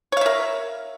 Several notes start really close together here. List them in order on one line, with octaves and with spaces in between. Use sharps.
C#5 F5 E5 A#4